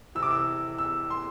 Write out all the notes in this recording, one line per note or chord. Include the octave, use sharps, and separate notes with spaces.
C3 E3 E6
D6
E6
E6
C6